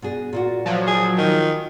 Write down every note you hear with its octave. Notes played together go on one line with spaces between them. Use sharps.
B2 D4 G#4
A#2 F4 F#4
F3 F#3
G#4
D#3